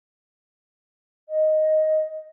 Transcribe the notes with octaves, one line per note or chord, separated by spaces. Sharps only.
D#5